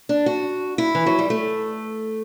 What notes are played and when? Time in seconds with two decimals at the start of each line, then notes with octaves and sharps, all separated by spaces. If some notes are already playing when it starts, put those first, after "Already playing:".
0.09 D4
0.26 F#4
0.78 E4
0.95 E3
1.06 F#3
1.19 G3
1.30 A3